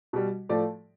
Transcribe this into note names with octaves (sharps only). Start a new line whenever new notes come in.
B2 G3
A2 F3 A3 D5